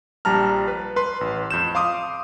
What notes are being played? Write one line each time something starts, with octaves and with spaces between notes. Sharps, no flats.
A#1 G3 A5 A#5 F6
B4
B4 C6
A1
F2 G6 E7
F5 C6 D6 D#6